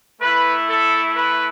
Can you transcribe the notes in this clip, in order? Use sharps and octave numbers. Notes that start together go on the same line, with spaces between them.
A3 E4 B4
A4
B4